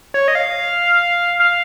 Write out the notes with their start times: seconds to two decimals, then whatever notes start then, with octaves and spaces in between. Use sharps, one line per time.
0.14 C#5
0.28 D#5
0.35 F5
1.40 F5